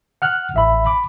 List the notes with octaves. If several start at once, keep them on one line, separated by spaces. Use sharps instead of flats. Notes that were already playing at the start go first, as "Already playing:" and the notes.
F#5 F6 F#6
A1 E5 B5
B5 D6